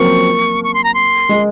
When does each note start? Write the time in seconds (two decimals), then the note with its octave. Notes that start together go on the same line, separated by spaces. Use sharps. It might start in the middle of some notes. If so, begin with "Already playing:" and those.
Already playing: F3 F#3 A#3 C4 C#6
0.64 C#6
0.74 C6
0.84 A#5
0.94 C6
1.29 G#3